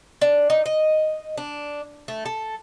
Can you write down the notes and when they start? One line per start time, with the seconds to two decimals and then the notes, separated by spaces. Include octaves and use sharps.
0.21 D4
0.50 D#4
0.66 D#5
1.37 D4
2.08 A3
2.26 A4